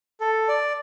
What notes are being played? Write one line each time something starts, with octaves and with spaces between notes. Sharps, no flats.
A4
D5